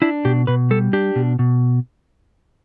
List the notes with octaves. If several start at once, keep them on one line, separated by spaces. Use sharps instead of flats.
D4 E4
B2 G4
B2 B4
G3 A4
D4 G4
B2
B2